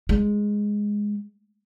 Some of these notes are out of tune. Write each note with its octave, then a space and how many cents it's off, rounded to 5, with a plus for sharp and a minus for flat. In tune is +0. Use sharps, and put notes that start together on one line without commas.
G#3 -5